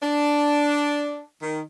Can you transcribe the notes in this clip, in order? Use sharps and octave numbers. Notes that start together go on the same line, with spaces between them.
D4
D#3